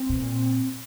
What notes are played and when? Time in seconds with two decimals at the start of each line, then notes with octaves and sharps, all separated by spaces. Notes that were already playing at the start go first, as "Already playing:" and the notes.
Already playing: C4
0.09 B2
0.21 A#2